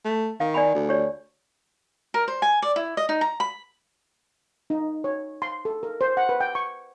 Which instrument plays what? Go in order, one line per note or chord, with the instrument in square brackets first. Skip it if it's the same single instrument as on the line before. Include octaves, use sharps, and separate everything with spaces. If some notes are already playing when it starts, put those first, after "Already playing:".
[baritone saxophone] A3
[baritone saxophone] D#3 [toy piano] F5
[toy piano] D5 G#5 B5
[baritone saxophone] D2
[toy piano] G4 C#5 D5
[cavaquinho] A#4
C5
G#5
D5
E4
D#5
D#4
A#5
B5
[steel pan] D#4
C#5
C6
A4
A#4
C5
F#5
B4
G5
C#6